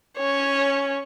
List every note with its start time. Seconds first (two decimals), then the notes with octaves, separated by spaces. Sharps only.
0.18 C#4 C#5